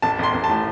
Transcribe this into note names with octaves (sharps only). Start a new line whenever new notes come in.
A1 A5
A1 C6
A1
A5
A2